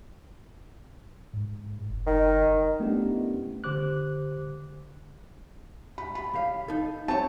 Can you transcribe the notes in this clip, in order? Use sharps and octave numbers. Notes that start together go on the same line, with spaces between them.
G#2
F#1
D#3
A3 B3 C#4 D4 E4 G4
D3 G4 C5 D6 F#6
B5
B5
C#2 G4 F5
D#4 A4
C4 C#5 A5